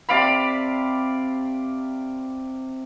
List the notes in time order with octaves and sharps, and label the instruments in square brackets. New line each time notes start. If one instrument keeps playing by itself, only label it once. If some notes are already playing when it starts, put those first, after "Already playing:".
[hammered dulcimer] C3 D5 F5 B5